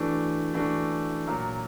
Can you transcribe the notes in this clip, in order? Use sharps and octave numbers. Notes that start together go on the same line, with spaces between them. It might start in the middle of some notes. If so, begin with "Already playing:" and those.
Already playing: E3 A3 D4 F#4
E3 A3 D4 F#4
A#2 F#3 A#3